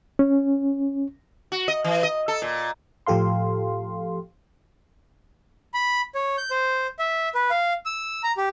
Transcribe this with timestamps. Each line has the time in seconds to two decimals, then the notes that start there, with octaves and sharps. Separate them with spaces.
0.19 C#4
1.52 F#4
1.68 D#5
1.84 E3
2.03 D#5
2.28 A4
2.42 A#2
3.07 A2 F3 G4 A4 F5 C6
5.74 B5
6.15 C#5
6.38 G6
6.51 C5
6.99 E5
7.35 B4
7.51 F5
7.86 E6
8.23 A#5
8.37 G4